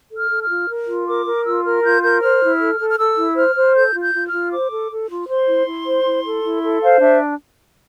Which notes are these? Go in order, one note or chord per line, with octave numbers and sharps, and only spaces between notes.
A4
F6
A4
F6
F4
A#4
F4
A#4 D6
A#4
F4 E6
A#4 F6
F4 G6
A#4 G6
C5 F6
E4
A4
A4
F6
A4 E6
E4
C5 F6
C5
A4 G6
F4
G6
F4
F6
F4
C5 D6
A4
A4
F4
C5 C6
E4
E4
C5
E4
A4
E4
A4
C5 F5
D4 E5